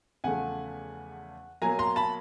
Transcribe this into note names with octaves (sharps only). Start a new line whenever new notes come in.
E2 C#3 F3 A3 F#5 G#5
B2 F#3 A#3 G#5 A#5
A#5 C6
A5 B5